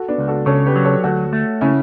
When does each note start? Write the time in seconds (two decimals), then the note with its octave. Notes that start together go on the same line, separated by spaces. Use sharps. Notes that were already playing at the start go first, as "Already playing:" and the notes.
Already playing: F#4 A4
0.08 B3 D4
0.18 C#2
0.28 F#4 A4
0.46 C#3 A4 C#5
0.66 G4 B4
0.76 F#3
0.84 A4 C#5
1.04 D2 F#4 A4
1.33 A3
1.61 C#3 C#4 E4